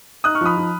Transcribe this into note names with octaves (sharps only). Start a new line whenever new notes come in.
D#4 D#6 F#6
C#6 F6
F3 B5 D#6
F3